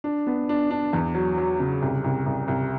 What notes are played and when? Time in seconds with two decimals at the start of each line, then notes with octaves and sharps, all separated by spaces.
0.04 D4
0.27 B3
0.49 D4
0.71 D4
0.93 E2
1.15 F#3
1.38 F#3
1.60 C#3
1.82 C2
2.04 C2
2.26 C2
2.48 C2